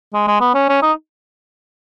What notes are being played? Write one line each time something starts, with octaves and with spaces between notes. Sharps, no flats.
G#3
G#3
B3
C#4
C#4
D#4